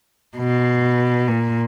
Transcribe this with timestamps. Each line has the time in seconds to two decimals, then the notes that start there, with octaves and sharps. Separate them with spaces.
0.38 B2
1.28 A#2